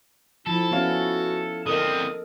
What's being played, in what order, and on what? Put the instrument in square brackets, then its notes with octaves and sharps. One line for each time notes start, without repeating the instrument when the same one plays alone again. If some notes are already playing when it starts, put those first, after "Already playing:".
[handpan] F3 [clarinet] E4 [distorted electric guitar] A4
[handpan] B3 C#4 [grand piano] E4 C#5 F5 [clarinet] F#4
[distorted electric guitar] D3 C4 [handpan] A4 A#4 D#5 [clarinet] D#6